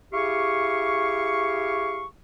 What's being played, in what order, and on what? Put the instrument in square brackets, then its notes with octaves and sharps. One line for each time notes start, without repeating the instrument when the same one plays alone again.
[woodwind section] E4 G4 G#4 F5 C#6